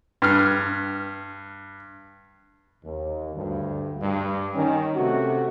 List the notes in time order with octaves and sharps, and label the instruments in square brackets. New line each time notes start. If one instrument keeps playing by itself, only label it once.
[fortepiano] G2 F6
[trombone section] D#2
D2 G2
G2
D#3 C#4
C3 A3 F#4